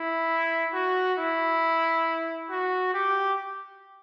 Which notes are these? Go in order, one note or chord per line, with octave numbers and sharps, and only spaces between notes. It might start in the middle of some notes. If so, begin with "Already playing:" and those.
Already playing: E4
F#4
E4
F#4
G4